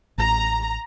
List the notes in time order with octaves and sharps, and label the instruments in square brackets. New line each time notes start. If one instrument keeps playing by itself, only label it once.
[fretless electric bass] A1 [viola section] A#5